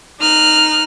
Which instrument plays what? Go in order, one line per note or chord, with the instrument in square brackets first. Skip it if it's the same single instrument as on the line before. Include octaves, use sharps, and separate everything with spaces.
[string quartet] D#4 F6 F#6